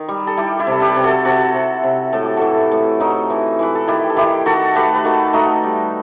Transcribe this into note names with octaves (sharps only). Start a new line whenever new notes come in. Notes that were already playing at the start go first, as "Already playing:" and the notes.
Already playing: D#3
G3
A4
G3 E4 G4
E4 G4
C3 A4
G4 B4
C3
F#4 A4
C3 F#4 A4
C3
C3
A2 A4
G4
E3 F#4 A4
A2
A2 D#4 F#4
E3
E3 B4
A4
D#3 E4 G4
A4
D#3 E4 G4
D#3 F#4 A4
A3 G4 B4
B4
D#3 F#4 A4
A3 D#4 F#4
G3